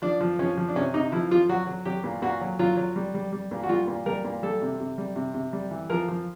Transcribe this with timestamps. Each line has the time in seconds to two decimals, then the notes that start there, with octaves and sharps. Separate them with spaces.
0.02 F3 D4
0.21 F3
0.39 F3 C#4
0.57 F3
0.69 D4
0.76 C3 C#4
0.94 C3 D#4
1.12 F3 E4
1.31 F3 F4
1.49 F#3 F#4
1.67 F#3
1.85 F#3 G4
2.04 A#2
2.22 A#2 F#4
2.41 F#3
2.59 F#3 F4
2.77 F#3
2.96 G3
3.14 G3
3.32 G3
3.51 A#2
3.63 F#4
3.69 G3 F4
3.88 A#2
4.06 G3 A#4
4.25 A#2
4.43 G3 A4
4.62 C3
4.80 C3
4.98 G3
5.16 C3
5.34 C3
5.53 G3
5.71 E3
5.90 F3 A#4
6.08 F3